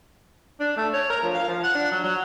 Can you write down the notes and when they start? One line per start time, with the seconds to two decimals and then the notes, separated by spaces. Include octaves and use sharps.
0.60 D4
0.77 A3
0.93 C#5
1.10 A#4
1.23 F3
1.34 F5
1.48 F3
1.63 F#5
1.75 D4
1.92 F#3
2.03 F#3